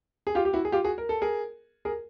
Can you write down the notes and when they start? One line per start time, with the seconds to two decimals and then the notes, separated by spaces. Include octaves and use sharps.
0.27 G#4
0.35 F4 G4
0.45 G4
0.53 E4 F#4
0.65 G#4
0.72 F4 G4
0.85 F#4 G#4
0.98 A#4
1.09 A4
1.21 G#4 A#4
1.85 G#4 A#4